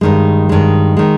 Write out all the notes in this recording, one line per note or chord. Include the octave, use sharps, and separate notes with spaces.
G2 D#3 G#3
G2 D#3 G#3
D#3 G#3